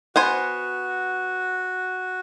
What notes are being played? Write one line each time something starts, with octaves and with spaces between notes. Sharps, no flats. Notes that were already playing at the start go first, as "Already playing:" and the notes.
B3 F#4 C5 G#5